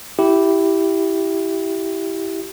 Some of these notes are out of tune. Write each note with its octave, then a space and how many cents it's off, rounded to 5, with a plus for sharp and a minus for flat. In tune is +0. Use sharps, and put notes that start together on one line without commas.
E4 +0 G4 -10